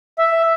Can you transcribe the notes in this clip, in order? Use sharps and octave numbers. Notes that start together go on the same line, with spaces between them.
E5